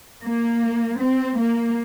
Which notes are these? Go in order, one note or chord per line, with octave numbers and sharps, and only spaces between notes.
A#3
C4
A#3